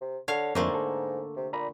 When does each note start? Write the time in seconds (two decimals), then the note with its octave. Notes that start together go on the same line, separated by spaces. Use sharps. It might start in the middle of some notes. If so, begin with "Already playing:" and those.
0.01 C3
0.28 D3 C#5 F5
0.55 F2 G#2 D3 A3 A#3
0.74 G#2 A4
1.36 C3
1.53 A#2 D5 A#5 B5